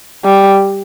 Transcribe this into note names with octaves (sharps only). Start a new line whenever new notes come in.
G3